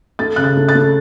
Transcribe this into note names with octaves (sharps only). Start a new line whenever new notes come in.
A3 A6
C#3 F#6
A6
A3
A6
A3